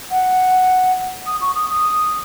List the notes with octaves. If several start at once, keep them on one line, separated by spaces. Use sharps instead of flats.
F#5
D#6
C#6
D#6
D#6